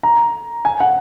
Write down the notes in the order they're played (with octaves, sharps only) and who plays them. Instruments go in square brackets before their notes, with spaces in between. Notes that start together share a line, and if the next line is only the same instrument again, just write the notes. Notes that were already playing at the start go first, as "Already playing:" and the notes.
[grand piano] A#5
G#5
F#5